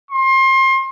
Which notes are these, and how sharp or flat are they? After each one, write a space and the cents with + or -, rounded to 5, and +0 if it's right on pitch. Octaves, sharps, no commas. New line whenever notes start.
C6 +30